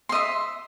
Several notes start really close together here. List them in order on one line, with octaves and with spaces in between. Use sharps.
C6 D#5 E5